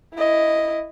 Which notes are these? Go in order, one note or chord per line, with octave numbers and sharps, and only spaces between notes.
E4 D#5